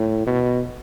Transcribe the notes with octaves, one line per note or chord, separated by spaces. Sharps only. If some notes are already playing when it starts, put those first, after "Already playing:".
Already playing: A2
B2